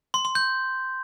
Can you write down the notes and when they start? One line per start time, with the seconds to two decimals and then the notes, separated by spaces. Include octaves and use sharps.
0.14 C6
0.25 C6
0.35 G6